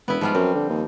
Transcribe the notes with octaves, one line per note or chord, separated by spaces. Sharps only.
E1 B3 E4
G#2 F3 G3 F4
F#2 C4
D3
D#2